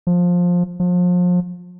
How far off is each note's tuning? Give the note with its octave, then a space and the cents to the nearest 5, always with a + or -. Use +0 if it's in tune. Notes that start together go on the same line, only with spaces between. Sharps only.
F3 +15
F3 +35